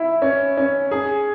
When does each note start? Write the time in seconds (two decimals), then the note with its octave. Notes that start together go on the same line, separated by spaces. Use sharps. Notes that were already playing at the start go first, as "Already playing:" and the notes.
Already playing: E4
0.22 C#4
0.57 C#4
0.91 G#4